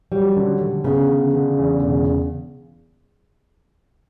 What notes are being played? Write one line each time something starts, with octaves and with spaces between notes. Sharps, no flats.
F#3 G3
D3
D3
C#3 B3
D3
D3
E2
E1